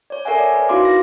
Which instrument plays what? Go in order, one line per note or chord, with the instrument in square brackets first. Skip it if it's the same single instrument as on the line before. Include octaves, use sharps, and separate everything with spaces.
[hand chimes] C#5 D5
A4 A#4 C#5 E5 F#5 G#5
D5
B4
D#4 E4 F#4 F5 C6 D6
A#6